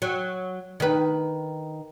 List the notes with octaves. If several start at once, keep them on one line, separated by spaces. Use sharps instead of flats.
F#3
D#3 B4